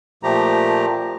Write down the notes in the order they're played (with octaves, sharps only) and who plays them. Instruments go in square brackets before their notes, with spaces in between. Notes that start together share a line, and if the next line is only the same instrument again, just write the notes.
[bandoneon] A#2 F3 A3 G4 A#5